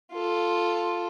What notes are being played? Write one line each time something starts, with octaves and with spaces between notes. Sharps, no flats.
F4 A4